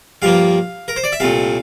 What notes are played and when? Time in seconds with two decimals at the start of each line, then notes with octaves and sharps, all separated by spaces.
0.22 G2 F3 A#3 F5
0.88 A#4
0.96 C5
1.04 D5
1.12 E5
1.20 C2 A#2 A3 F5